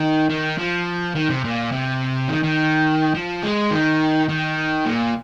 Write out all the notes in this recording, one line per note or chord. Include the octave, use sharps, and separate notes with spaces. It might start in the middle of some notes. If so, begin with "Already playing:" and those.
Already playing: D#3
D#3
F3
D#3
C3
A#2
C3
D#3
D#3
F3
G#3
D#3
D#3
A#2